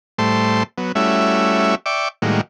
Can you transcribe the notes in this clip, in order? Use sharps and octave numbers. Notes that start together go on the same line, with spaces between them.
A2 G3 A3 C5 A5 C6
F#3 B3
G3 A3 C#4 E4 F#4 E5
D5 E5 G5 C#6 D6
A2 D#3 G3 G#3 A#3 F#4